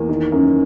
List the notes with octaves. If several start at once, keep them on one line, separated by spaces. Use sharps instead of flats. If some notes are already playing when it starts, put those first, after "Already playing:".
Already playing: E2 A#3
D#3
F#2